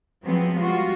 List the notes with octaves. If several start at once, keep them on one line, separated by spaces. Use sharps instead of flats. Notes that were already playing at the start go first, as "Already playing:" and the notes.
F3 F#3 G#3 B3 C4
G3 F4 F#4